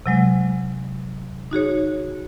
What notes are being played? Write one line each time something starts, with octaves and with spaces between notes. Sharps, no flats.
C3 F#3 G#3
D#4 F#4 G#4 C#5